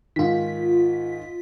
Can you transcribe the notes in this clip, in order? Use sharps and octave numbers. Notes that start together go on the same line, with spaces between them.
G#2 D#3 F4 B6